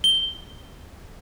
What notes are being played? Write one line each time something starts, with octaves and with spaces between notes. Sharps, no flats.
G7